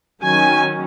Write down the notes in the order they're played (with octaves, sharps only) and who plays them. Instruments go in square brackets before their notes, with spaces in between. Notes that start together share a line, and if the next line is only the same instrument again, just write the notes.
[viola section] D#3 F#3 C#4 G#5